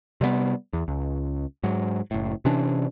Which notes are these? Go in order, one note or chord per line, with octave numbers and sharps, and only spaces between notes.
C3 G3 G#3 B3
E2
C#2
G#2 F#3
F#1 A2
C3 E3 C#4 D4